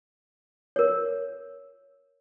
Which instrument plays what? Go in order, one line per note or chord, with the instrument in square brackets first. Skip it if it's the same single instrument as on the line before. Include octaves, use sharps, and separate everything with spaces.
[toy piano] A#4 C#5